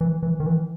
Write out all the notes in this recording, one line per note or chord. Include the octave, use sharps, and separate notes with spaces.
E3
E3
D#3
E3